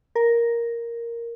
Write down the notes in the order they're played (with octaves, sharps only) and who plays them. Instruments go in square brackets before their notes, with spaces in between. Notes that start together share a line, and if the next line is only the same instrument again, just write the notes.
[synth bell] A#4